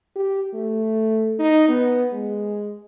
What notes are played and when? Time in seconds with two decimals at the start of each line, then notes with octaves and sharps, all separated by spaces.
0.15 G4
0.54 A3
1.39 D#4
1.68 B3
2.12 G#3